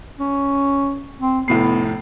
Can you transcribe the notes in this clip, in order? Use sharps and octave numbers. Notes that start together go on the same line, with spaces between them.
C#4
C4
F1 A2 B3 C7